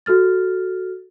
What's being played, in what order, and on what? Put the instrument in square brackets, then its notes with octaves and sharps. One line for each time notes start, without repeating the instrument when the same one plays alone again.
[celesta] F#4 A4 F6 A6